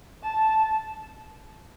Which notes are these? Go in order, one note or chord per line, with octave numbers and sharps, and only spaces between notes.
A5